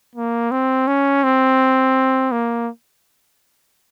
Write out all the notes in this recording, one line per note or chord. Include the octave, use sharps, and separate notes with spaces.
A#3
C4
C#4
C4
A#3